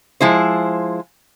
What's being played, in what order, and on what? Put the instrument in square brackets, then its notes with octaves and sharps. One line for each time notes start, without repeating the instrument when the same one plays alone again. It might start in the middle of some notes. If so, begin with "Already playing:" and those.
[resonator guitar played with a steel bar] F3 G#3 E4 C5